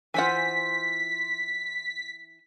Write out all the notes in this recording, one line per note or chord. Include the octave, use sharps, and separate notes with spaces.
E3 F4 C5 F#5 G#5 B6